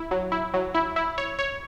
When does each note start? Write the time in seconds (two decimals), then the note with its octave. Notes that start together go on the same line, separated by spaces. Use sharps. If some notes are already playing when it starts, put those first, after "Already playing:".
Already playing: E4
0.11 F#3
0.32 E4
0.54 F#3
0.74 E4
0.96 E4
1.18 C#5
1.39 C#5